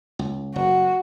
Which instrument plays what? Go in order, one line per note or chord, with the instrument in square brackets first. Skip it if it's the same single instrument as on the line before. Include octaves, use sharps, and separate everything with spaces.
[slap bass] C#2
[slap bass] F#1 [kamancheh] F#4